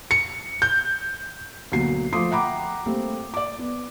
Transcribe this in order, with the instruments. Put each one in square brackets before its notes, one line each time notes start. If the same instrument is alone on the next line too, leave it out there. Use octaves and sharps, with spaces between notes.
[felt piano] C#7
G6
D2 B2 F#3 A#3 C7
F3 A3 C6 D6 D#6 C7
E5 F#5 G5 A#5 B5 D6
G3 A3 A#3 C4
D5 D6
B3